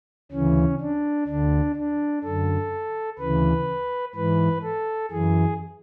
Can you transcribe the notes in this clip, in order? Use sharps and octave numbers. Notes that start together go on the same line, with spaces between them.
D2 C#3 E3 C#4
D4
D2 D3 D4
D4
F#2 D3 A4
D2 C#3 E3 B4
G#2 E3 B4
A4
F#2 E3 G#4